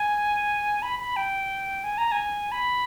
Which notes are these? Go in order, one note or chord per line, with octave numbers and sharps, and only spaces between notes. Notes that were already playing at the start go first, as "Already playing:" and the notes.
Already playing: G#5
B5
B5
G5
G#5
A#5
G#5
B5